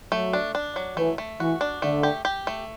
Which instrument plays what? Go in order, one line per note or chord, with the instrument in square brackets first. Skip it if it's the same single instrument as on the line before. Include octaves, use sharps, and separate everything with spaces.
[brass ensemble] F#3 [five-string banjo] A3
[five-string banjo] D4
D4
F#3
[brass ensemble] E3 [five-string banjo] A3
[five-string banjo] A3
[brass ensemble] E3 [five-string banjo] F#4
[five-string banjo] D4
[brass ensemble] D3 [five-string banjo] A3
[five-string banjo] G4
G4
A3